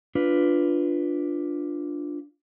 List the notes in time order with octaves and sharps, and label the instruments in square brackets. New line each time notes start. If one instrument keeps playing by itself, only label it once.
[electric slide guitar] D4 F4 B4